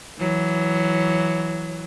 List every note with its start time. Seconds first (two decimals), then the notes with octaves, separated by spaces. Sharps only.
0.18 E3 F#3